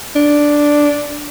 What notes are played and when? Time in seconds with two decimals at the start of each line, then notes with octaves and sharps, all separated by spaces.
0.15 D4